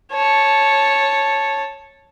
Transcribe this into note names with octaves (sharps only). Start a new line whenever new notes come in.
C#5 A5